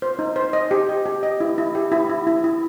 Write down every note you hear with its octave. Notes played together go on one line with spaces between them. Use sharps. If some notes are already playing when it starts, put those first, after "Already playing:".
C5
D#4
C5
D#5
G4
D#5
G4
D#5
E4
E4
G4
E4
E4
E4
E4